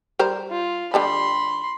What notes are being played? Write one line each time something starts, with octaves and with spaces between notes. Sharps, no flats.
G3 A#4 C5
F4
D3 G3 A5 B5 C6